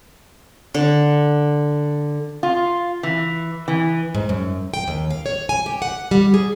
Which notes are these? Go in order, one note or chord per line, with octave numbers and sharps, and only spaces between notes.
D3
F4
E3
E3
G#2
F#2
G5
D#2
F5
C#5
G#5
G4
F#5
G3
G#4